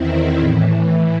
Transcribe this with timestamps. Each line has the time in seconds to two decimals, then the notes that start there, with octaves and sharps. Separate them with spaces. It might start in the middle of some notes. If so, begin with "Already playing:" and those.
Already playing: E2 D#3 C4 E4
0.39 A2 E3